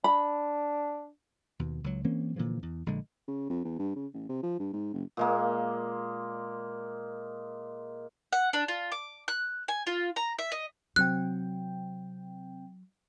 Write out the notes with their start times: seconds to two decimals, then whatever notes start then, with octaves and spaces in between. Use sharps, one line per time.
0.04 D4 B5
1.59 D#2 B2
1.84 C#2 F#3
2.04 E3 A#3 C4 C#4
2.36 A#2 D3 E3 F3
2.63 E2
2.86 A#1 D3 G#3
3.28 C#3
3.50 F2
3.64 E2
3.79 G2
3.96 C#3
4.14 A1
4.29 C3
4.43 F3
4.59 G2
4.73 G#2
4.94 F#1
5.17 A#2 G#3 A#3
8.33 F#5
8.53 D4
8.68 F4
8.92 D6
9.28 F#6
9.68 G#5
9.87 F4
10.16 A#5
10.39 E5
10.52 D#5
10.96 C3 F#3 C4 G5 F#6